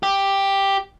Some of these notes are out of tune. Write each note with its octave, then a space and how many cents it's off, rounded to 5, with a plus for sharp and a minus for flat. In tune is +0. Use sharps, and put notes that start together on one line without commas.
G4 +5